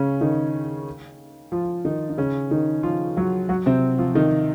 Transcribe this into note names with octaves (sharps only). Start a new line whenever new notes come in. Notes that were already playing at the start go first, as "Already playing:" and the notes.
Already playing: C#3 C#4
D#3 D#4
F3 F4
D#3 D#4
D#4
C#3 C#4
D#3 D#4
F3 F4
F#3 F#4
F#3 F#4
C3 C4
F3 F4
D#3 D#4